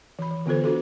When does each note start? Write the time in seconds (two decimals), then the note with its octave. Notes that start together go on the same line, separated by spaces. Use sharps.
0.19 E3 B5
0.31 E3
0.46 D3 B3 F4 A4 C5
0.64 D4 F#4 A4